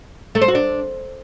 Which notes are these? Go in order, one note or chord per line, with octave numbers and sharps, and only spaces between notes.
A3
C5
F#4
D4